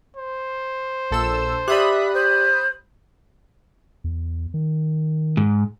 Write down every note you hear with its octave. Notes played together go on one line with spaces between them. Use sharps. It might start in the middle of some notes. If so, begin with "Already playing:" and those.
C5
A#1 A4 E6
G4 D5 E5 B5 D#6 F#6
C5
E2
D#3
G#2